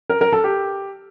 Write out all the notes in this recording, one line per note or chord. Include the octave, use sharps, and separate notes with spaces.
A#4
A#4
A4
G4